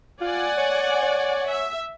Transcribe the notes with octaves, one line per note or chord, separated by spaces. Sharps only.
F4 D5 F#5 G#5
C#5
C#5
E5